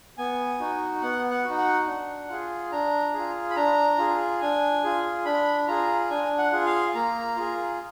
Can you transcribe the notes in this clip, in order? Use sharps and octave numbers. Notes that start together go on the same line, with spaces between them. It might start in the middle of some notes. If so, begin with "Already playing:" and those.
B3 G#5
D#4 F#4
B3 F#5
F#5
D#4 F#4
F#5
D4
F4 G#4
D4 A#5
F4 G#4
B5
D4 A#5
F4 G#4
D4 G#5
F4 G#4
D4 B5
F4 G#4 A#5
D4 G#5
F#5
F4 G#4
F5
A#3 A#5
F4 G#4